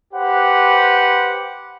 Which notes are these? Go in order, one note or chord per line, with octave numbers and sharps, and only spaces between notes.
G4 B4 C5 F#5